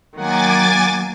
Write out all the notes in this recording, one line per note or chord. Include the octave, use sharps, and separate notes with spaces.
D#3 F#3 A#3 F#5 G#5 D6 A6